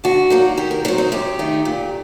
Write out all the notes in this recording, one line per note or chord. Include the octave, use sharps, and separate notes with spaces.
D3 F#4
F#3 A#3 D#4
D#3 G4
A#4
F#3 C4 D#4 C5
D#4
F#2 G4
D#3 A3 D#4
A#2